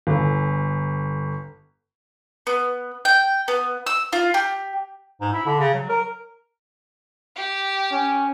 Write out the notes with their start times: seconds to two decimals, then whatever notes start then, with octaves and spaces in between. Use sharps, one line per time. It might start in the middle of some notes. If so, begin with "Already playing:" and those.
0.07 G1
2.47 B3
3.05 G5
3.48 B3
3.87 E6
4.13 F4
4.34 G4
5.21 G#2
5.33 E4
5.46 D3
5.59 C#3
5.74 F#3
5.89 A#4
7.36 G4
7.92 C#4